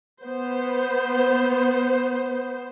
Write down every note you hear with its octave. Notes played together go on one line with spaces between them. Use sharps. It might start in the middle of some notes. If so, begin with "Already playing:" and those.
B3 C5